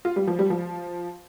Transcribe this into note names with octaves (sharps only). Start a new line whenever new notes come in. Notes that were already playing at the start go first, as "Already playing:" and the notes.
F4
G3
F3
G3
F3